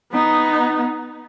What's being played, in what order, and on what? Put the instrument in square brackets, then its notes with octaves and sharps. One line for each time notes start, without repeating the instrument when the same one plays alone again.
[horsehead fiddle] B3 D#4